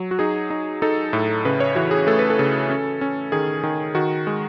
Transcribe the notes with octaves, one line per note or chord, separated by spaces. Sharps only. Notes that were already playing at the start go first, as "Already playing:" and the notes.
Already playing: F#3
F#4
D#4 G#4
D#4
D#4 A4
A2
C#3 B4
C#5
E3 F#4
G#4
A3 A4
B4
A4
C#3
C#4
C#4
D#3 G#4
D#3
D#3 F#4
G#3